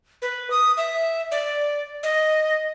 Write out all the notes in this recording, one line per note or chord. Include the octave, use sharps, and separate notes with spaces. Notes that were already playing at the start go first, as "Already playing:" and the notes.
B4
D#6
E5
D5
D#5